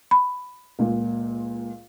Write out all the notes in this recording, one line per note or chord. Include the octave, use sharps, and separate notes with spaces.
B5
C#2 A#2